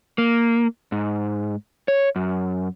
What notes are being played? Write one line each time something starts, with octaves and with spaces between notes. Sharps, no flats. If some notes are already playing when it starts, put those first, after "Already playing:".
A#3
G#2
C#5
F#2